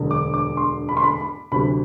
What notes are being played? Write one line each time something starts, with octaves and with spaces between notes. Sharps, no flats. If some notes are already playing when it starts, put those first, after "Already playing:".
Already playing: E1 D2 D3 F#3
D6
D6
C6
B5
C6
B5
B5
D2 C3 F#3 B5